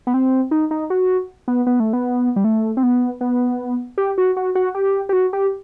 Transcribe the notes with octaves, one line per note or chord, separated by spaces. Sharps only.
B3
C4
D#4
D#4
F#4
B3
B3
A3
B3
G3
A3
C4
B3
B3
G4
F#4
F#4
F#4
G4
G4
F#4
G4